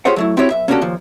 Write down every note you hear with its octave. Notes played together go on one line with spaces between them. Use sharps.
F4 G4 G#4 C5 C#5 F#5
F#3 A3 E4
C4 E4 F#4 G4 C#5
B1 E5
A#3 C#4 D4 F#4 G4 A4
D#2 A#2 F3